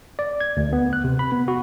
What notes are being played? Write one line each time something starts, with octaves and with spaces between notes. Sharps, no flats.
D5
G#6
D2
B3
F#6
C3
B5
B3
F#4